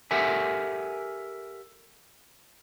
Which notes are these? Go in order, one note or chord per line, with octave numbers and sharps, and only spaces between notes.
G4 A4 A#4 E5 F#5 G#5